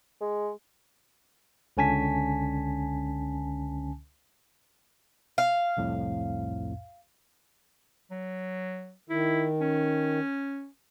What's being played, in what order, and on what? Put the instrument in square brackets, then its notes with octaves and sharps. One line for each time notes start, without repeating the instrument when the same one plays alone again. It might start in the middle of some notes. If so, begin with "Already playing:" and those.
[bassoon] G#3
[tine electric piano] C#2 D3 C#4 G#5 A5 B6
[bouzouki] F5
[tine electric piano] C2 F2 A2
[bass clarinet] F#3
[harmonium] D#3 [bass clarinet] E4
[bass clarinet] C#4